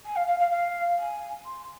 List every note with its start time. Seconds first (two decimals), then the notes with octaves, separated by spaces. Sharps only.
0.05 G#5
0.15 F5
0.27 F5
0.39 F5
0.51 F5
0.98 G#5
1.45 C6